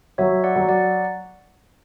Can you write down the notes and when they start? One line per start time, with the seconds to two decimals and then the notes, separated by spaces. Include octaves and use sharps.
0.18 F#3 C#5 E5
0.44 D5 F#5
0.56 F#3
0.69 D5 F#5